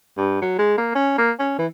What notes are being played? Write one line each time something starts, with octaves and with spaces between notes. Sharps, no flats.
G2
F#3
G#3
A#3
C#4
A#3
C#4
E3